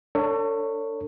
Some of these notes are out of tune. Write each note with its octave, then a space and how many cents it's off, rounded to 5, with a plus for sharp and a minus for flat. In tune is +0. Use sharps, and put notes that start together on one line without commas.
D4 +0 A4 +40 C#5 +0